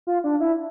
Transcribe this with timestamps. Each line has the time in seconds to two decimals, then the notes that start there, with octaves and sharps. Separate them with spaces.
0.07 F4
0.24 D4
0.40 E4